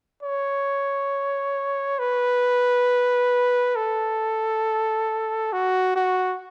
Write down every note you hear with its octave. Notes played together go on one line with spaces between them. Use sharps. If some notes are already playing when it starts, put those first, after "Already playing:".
C#5
B4
A4
F#4
F#4